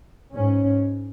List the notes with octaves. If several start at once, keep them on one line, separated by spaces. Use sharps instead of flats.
G#2 C#4